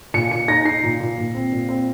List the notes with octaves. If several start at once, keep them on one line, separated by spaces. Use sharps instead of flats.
A#2 C#7
A#2 C#7
D#4 A#6
D#4 C7
A#2
A#2
A#2
C4
A#2
C4